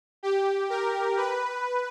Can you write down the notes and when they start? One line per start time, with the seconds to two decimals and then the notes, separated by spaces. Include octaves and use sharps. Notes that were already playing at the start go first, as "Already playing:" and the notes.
0.23 G4
0.70 A#4
1.17 B4